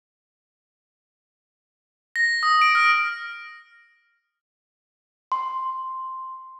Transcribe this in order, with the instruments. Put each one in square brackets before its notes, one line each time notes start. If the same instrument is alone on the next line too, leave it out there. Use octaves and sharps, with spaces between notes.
[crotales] A#6
D#6
D7
F6
[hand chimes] C6